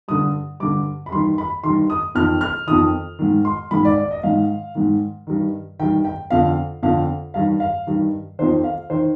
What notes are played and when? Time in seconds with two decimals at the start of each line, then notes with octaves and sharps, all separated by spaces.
0.08 G2 D3 D#6
0.60 G2 D3 D6
1.06 B5
1.11 G2 D#3 C6
1.38 B5
1.63 G2 D#3 C6
1.90 D#6
2.15 F2 F6
2.19 D#3
2.41 F6
2.67 F2 D#3 D#6
3.19 G#2 D#3
3.45 C6
3.71 G#2 D#3 B5
3.85 D5
3.98 D5
4.11 D#5
4.23 G#2 D#3 F5
4.75 G#2 D#3
5.27 G2 D#3
5.80 G2 D#3 G5
6.05 G5
6.30 F2 D3 F5
6.83 F2 D3 F5
7.34 G2 D#3 F5
7.60 F5
7.87 G2 D#3
8.39 D#3 C5
8.42 F2
8.64 F5
8.90 D#3 C5